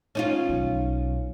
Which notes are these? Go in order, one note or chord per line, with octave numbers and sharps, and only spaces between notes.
C#4 D#4 F4
B1